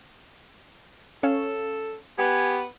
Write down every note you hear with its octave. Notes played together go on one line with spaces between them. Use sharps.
C#4 A4 C#5 F5
B3 G4 G#5